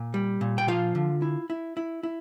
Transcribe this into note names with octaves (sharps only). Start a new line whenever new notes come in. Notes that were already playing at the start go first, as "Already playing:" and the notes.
Already playing: A#2
G3
A#2
G5
F3 F4 F5
D3
E4
E4
E4
E4